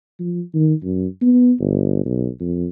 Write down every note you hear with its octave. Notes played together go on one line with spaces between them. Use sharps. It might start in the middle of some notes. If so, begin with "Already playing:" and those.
F3
D#3
F#2
B3
G1
B1
F2